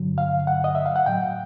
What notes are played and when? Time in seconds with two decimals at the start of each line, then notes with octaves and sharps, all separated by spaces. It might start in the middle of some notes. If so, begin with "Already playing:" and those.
Already playing: G2 D3 F#3
0.18 F5
0.47 F#5
0.64 D#5
0.75 E5
0.86 F5
0.96 F#5
1.06 A2 F#3 G5